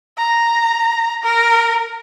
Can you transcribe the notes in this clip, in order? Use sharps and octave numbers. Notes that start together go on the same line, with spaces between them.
A#5
A#4